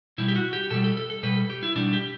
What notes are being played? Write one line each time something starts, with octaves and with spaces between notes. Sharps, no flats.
B2 G3 E4
G4
F#4
G4
B2 G3 A4
A4
A4
A4
B2 G3 B4
A4
G4
E4
B2 G3 D4
G4